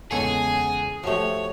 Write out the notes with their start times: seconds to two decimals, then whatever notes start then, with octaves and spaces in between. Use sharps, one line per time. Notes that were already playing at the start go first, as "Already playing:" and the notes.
0.11 E2 C#3 G#3 G#4 A4 C#5 G#5
1.03 F3 A3 F#4 G4 C#5